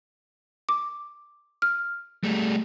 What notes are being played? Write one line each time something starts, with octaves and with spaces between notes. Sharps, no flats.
D6
F6
G3 A3